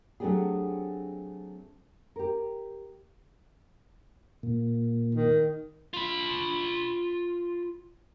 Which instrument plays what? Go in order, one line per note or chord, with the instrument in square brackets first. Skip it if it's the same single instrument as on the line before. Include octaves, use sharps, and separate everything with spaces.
[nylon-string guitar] F#3 A3 C4 D4 G4 G#4
G4 A#4
[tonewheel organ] A#2
[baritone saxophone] D#3
[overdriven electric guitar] F4 B5